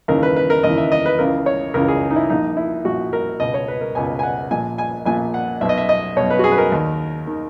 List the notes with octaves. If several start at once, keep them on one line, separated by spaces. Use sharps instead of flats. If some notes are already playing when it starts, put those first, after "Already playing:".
D#2 C#3 E3 A#4
B4
B4
A#4
D#2 C#3 E3 D#5
E5
D#5
B4
C#2 C#3 E3 A#4
C#5
C#2 C#3 E3 A#4
G#4
D#4
E4
A#1 A#2 D#4
E4
A#1 A#2 F#4
A#4
C#2 B2 D#5
C#5
B4
A#4
C#2 B2 G#5
G#5
F#5
A#1 A#2 G#5
G#5
A#1 A#2 G#5
F#5
B1 B2 E5
D#5
E5
D#5
B1 B2 C#5
B4
F#4
G#4
B4
A#4
D#2 D#3
D#3